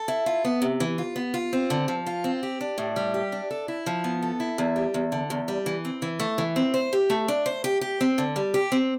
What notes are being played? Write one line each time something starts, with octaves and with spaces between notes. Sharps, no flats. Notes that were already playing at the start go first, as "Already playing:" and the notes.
Already playing: A4
E4
F4
B3
C3
E3
F4
B3
F4
C4
D3
F3
F4
C4
G4
D4
A2
G3
G4
D4
A4
E4
F3
B3
A4
E4
E2
G3
E2
D3
E2
G3
E3
C4
E3
A3
E3
C4
C5
G4
A3
D4
C5
G4
G4
C4
D3
G3
G4
C4